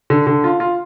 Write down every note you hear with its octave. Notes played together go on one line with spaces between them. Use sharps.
D3
D3
F4
F4